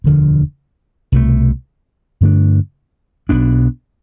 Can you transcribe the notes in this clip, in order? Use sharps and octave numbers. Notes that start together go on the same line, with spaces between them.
E1 D2 D3 F3
C2 B2 A3
G2 D3 A3 D4
B1 B2 B3 D4